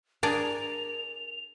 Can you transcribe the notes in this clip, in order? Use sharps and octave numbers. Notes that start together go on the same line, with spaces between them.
D4 G#4 A#4 D5 F7